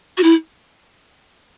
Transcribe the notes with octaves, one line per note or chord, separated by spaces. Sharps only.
F#4
E4